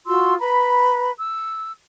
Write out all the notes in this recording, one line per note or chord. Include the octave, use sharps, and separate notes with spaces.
F4 F#4 C6 E6
B4 A#5 B5
E6